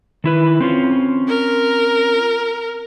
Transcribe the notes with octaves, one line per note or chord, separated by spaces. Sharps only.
D#3 E4 B4
C4 C#4 F4
A#4